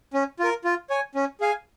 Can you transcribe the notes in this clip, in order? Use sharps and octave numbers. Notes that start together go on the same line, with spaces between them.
C#4
F4 A#4
F4
C#5 G#5
C#4
G#4 F5 G#5